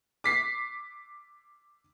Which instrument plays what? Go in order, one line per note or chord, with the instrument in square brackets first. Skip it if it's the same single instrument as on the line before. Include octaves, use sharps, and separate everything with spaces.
[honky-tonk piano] D6 B6 C7